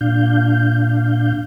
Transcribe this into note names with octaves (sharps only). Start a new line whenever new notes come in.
A#2 D4 F5 G6